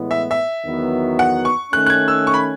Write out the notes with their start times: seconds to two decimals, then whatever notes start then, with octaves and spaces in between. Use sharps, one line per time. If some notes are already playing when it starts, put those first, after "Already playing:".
Already playing: A2 E3 G#3 B3
0.11 E5
0.31 E5
0.64 E2 D#3 F#3 B3 F#4
1.19 F#5
1.45 C#6
1.72 D#3 A3 C#4 F#6
1.86 F#6
1.90 G#6
2.08 E6
2.27 C#6
2.34 B5